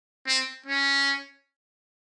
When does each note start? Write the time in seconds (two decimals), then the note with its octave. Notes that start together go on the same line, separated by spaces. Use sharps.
0.27 C4
0.66 C#4